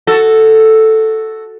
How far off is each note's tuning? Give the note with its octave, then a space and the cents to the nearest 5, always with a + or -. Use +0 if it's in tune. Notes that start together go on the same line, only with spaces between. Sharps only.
F#4 +0 A4 +0